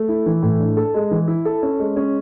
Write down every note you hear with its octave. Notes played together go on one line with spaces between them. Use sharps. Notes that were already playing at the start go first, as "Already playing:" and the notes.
Already playing: A3
E4
E3
A2
D4
A4
G#3
E3
E4
A4
C#4
G#3
C#4